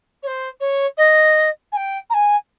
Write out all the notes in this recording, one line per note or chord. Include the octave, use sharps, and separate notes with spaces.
C#5
C5
C#5
D#5
G#5
G5
A#5
G#5